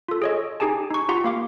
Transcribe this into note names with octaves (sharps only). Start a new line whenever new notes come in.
F4 A4
G#4 C#5 D#5
D#4 G4 G#4 G#5 A5
D#4 C#6
F4 G4 F#5 A#5 C6
A#3 F5 D6